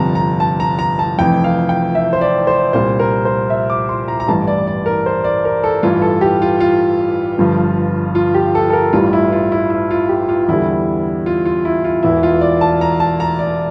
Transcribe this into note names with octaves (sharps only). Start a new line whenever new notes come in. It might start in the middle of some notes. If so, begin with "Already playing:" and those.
Already playing: G1 F2 C3 G3 A5 A#5
A#5
A5
A#5
A#5
A5
F1 F2 E3 G5
F5
G5
E5
C5
D5
C5
C2 A#2 G3 C5
A#4
C5
E5
D6
C6
A#5
A#5
A1 G2 E3 G3 A5
D5
D5
A#4
C5
D5
A#4
A4
A1 G2 E3 F4
A4
G4
F4
F4
G1 G2 F3
F4
G4
A4
A4
A#4
A1 G2 E3 G3 F4
E4
F4
E4
E4
F4
G4
F4
E2 D3 G3 E4
F4
F4
E4
F4
E1 E2 E3 E4
F4
D5
A5
A#5
A5
A#5
D5